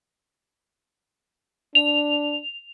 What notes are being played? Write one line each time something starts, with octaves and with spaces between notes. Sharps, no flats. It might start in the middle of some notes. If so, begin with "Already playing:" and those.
D4 F7